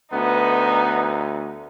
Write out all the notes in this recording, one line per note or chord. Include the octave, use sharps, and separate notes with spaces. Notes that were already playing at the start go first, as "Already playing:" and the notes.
D2 B3 D#4